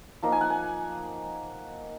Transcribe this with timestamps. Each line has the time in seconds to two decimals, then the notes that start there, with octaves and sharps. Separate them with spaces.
0.23 F3 A#3 D#4
0.32 G#5
0.41 F#5
0.50 G#5